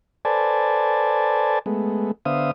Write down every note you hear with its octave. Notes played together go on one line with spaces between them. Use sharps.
A4 B4 C5 D5 G#5 A5
G#3 A3 B3
D3 B3 C5 E5 F5 D#6